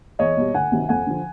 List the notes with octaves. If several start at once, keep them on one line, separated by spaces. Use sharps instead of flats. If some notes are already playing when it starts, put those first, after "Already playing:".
E2 C#5 D#5
B2 G3
D2 F#5 G#5
C3 D#3 F#3
F2 F#5 G#5
D3 F3